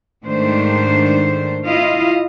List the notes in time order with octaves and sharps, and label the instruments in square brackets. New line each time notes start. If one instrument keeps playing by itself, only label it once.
[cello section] G#2 D#3 A3 D4 C5
E4 F4 D#5 F5